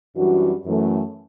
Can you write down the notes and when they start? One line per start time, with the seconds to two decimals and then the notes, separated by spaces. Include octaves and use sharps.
0.16 F#2 E3 G3 D4 F#4
0.65 F#2 E3 A3